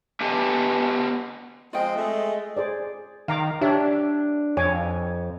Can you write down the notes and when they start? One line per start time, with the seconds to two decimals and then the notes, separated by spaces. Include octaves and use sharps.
0.21 B3 G4 B4 D#5 G#5 A5
1.73 F3 G#3 C4 F4 D#5 G5
1.96 G#3 A3
2.57 G#4 C5 D5
3.28 D#3 F5 A#5 D6
3.61 D4 G4 C#5 E5
4.57 F2 C#5 G#5 D6